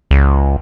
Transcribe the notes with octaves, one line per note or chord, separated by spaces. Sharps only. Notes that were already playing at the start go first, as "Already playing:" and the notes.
C#2